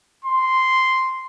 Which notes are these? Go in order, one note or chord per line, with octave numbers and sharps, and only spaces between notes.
C6